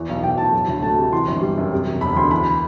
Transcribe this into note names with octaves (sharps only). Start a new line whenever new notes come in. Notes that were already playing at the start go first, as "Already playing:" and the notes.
Already playing: E2 E3
B1
B1 G5
A2 A5
F#3
D2
A3 A5
C3
E3 C6
G1
G3
F#2
C3
E1
E1 B5
D2 C6
E3 B5